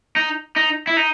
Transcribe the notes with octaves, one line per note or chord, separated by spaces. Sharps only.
D#4
D#4
E4
D#4